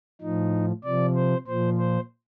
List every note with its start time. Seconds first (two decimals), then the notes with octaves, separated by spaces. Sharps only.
0.21 A2 F3 D#4
0.84 C3 F3 D5
1.16 C5
1.48 A#2 F3 C5
1.78 C5